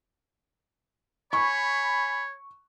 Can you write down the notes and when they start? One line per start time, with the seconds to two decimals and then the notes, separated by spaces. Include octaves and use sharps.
1.33 C#5 G#5 B5 C#6